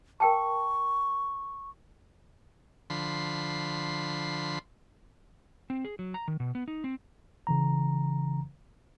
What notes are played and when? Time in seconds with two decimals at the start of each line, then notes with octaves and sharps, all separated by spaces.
0.20 A#4 G5 A5 C#6
2.90 D3 F3 B5 C6
5.70 C4
5.85 G#4
5.99 F#3
6.14 A#5
6.28 D#3
6.40 B2
6.55 B3
6.68 D#4
6.84 C4
7.47 C#3 E3 A#5